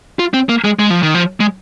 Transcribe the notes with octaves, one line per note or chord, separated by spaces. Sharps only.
F4
C4
A#3
G#3
G#3
F3
D#3
F3
G#3